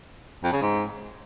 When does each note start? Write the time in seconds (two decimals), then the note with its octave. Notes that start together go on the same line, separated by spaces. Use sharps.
0.43 F2
0.52 C#3
0.62 G#2